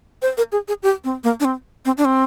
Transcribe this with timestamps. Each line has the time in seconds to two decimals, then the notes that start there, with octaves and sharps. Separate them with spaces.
0.22 C5
0.37 A#4
0.52 G#4
0.68 G#4
0.83 G4
1.04 C4
1.24 A#3
1.40 D4
1.45 C4
1.85 C4
1.98 D4
2.05 C4